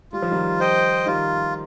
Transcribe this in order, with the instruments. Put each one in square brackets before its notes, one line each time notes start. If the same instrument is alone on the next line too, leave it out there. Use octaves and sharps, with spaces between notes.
[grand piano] G3 [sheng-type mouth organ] F4
[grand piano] F3
D#3 G3
[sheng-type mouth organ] C5 D#5 G5
[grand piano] D#3 G3 [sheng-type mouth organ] F4